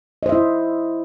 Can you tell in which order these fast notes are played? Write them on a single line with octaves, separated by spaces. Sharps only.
D#5 C5 E5 E4